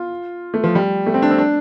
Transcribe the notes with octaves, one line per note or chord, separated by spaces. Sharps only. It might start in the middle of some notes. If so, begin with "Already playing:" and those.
Already playing: F4
A3
F3
G3
A3
C4
D4
C4
D4